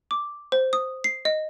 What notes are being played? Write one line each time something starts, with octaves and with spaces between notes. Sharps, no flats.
D6
C5
D#6
C7
D#5